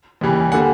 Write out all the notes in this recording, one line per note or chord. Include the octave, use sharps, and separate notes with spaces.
D#2 C#3 E3 G3
D3 G3 A#3 F#5 G#5